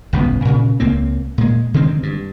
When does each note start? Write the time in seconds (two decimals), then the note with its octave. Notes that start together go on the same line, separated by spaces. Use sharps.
0.13 G1 C#2 A2 B3
0.45 A#2 C#3
0.80 C#2 A#3 C4
1.38 A#2 G#3
1.74 D3 D#3 G#3 C4
2.03 G2